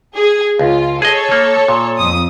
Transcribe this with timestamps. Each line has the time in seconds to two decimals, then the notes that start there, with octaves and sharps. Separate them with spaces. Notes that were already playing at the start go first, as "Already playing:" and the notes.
0.15 G#4
0.59 C#2 F4
1.02 G#4 A4 C#5 D#5
1.31 A#3
1.68 A#2
1.98 F2 D#6